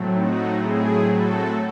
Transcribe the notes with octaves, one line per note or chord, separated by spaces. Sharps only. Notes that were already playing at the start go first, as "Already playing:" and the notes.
Already playing: A2 F#3 A3 C4
D#4 F#4
E4 G#4
F#4 A4